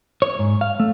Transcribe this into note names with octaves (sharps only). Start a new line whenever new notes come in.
C#5
G#2
F5
A3